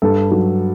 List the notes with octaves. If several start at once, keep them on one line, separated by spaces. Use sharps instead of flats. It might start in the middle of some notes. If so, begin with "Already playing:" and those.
G2 A4
F#3